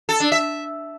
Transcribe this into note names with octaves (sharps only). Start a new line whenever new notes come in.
A4
D4
E5